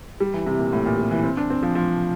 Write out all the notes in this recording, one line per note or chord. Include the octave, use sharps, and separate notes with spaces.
G3
E3
C3
A#2
A2
A#2
C3
E3
C4
D4
C4
F3
F3